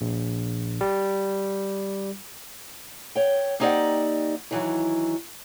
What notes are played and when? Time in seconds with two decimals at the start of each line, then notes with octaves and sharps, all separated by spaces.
0.01 A#1
0.81 G3
3.15 C#5 G5
3.60 A#3 C4 D#4 G4 D5 F#5
4.51 D#3 E3 F#3